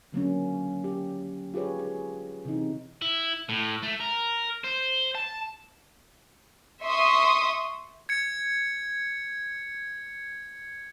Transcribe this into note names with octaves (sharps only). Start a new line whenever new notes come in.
D3 F#3 A#3 C#4
G4
F4 G4 G#4 B4 C#5
G#4
C3 E3 D#4
E4
A2
A3
A#4
C5
A5
E5 C6 C#6 D#6
G#6 C#7